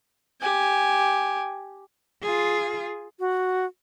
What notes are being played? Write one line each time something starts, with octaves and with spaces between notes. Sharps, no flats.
G4 G#5
F4 G#4
F#4